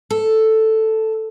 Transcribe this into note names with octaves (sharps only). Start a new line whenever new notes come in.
A4